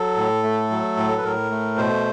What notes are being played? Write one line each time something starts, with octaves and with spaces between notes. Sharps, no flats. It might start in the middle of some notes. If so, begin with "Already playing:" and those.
Already playing: F#3 A4
A2
A3
F#3
A2
B4
A2 A#4
A3
B2 C5